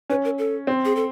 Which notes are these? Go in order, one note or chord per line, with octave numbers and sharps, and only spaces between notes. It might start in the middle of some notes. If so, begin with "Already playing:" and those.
C#4 B4
A#4
A4
C4
G#4
A4